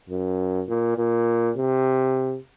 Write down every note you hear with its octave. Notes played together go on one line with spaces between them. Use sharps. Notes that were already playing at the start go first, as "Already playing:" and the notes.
F#2
A#2
A#2
C3